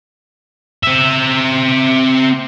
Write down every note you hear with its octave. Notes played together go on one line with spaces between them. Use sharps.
C4 E5